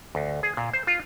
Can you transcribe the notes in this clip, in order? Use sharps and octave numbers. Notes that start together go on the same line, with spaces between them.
D2
G#4
A#2
C5
F4